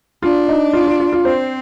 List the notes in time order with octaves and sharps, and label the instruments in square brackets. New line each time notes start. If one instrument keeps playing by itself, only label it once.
[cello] D4 [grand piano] F4
[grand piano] D#4
F4
F4
F4
F4
[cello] C4 [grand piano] C5